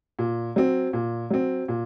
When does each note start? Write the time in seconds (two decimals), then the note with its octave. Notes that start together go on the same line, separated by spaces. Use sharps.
0.19 A#2
0.56 F#3 C4
0.93 A#2
1.30 F#3 C4
1.68 A#2